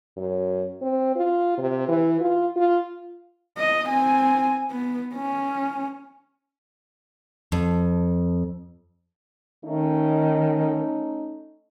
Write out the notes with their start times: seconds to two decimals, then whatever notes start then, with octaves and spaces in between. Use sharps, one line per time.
0.17 F#2
0.82 C4
1.16 F4
1.58 C3
1.88 E3
2.21 F4
2.56 F4
3.57 D#5
3.88 C4 G#5
4.71 B3
5.15 C#4
7.52 F2
9.65 D#3 A3 C#4 D#4